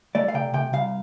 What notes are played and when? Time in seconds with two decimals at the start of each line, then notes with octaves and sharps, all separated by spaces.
0.15 A3 D5
0.28 F5
0.34 C3 G5
0.54 C3 G5
0.73 C2 F5